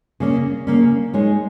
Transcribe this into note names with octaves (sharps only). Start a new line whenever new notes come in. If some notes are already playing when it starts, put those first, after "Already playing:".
C#3 A#3 C#4
C#3 A#3 C#4
G#3 D#4 C#5